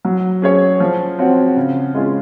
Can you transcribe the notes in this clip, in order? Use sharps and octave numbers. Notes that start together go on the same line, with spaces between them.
F#3
C#4 G#4 C#5
F3
C4 F#4 C#5
C#3
G#3 C#4 F4 G#4